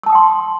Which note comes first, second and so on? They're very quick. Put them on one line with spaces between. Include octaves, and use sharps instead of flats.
E6 A5 D#6 G5 C6